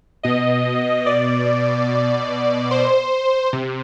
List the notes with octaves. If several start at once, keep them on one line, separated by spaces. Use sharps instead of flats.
B2 D#5
D5
C5
C3